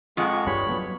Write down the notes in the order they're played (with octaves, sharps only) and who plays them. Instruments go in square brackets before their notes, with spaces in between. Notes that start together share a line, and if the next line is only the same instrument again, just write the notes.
[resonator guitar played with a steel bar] F2 [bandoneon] G#3 C#6 [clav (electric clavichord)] F4 F#5
[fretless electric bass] G2 G3 [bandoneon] C#5 B5
[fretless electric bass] F#3 B3